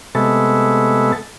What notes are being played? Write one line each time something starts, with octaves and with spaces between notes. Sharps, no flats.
C3 G#3 A3 B3 A4